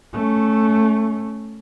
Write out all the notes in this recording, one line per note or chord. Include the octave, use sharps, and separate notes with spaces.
A3 C#4